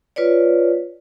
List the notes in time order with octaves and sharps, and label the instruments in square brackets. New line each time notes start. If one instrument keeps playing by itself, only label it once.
[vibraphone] F4 B4 C#5 D5